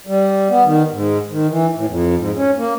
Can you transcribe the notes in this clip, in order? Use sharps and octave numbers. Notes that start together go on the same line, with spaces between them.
G3
B3
D#3
G#2
D#3
E3
A2
F2
G#2
C#4
A#3